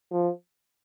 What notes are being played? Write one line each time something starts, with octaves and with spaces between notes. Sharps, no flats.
F3